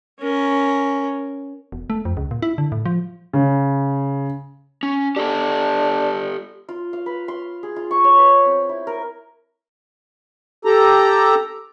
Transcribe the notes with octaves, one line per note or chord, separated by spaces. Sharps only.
C#4 A#4
E1
A3
F2
C#2
A#2
E4
D3
A2
F3
C#3
C#4
D4 G4 A4 D5
F4
F5
B4
C6
G#4
F4
C#6
C#5
B4
C4
E4
A#4
G4 A4 A#5